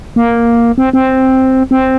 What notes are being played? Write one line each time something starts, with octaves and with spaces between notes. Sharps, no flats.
A#3
C4
C4
C4